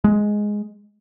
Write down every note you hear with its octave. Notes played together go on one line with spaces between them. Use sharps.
G#3